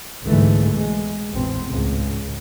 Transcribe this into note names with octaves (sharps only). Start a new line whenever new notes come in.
C2 G#2 D3 E3 G#3 A3
B2 G#3
A1 E2 B2 C4
C#2 G#2 C#3